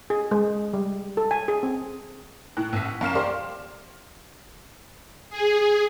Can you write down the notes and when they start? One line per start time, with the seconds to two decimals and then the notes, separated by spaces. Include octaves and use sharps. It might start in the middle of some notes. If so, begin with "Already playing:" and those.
0.10 G#4
0.31 G#3
0.74 G3
1.17 A4
1.31 G#5
1.48 G#4
1.63 C4
2.57 A2 F#6
2.73 A1 B6
2.85 F#5
3.01 F#2 F5 F6 E7
3.15 G4 C5 D5 F5
5.30 G#4